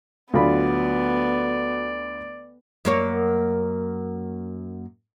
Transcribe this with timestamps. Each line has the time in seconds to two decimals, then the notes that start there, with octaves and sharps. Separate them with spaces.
0.33 D2 F#3 B3 D4 F4 D5 B5
2.85 F#2 A#3 C#5